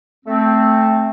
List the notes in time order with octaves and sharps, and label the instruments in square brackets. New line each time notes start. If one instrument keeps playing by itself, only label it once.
[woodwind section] A3 C4